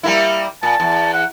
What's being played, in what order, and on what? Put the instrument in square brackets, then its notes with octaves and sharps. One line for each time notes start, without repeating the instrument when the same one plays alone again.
[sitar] G3 A#3 E4
[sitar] A#2 [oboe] A5
[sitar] E2
[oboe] F#5